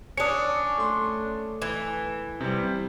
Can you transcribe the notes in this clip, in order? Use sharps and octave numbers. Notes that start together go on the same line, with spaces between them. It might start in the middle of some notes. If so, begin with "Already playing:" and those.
C#4 D4 D#6 C#7
A3 C6
E3
C3 G3